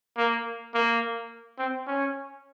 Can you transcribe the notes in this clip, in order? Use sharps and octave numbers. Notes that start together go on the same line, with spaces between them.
A#3
A#3
C4
C#4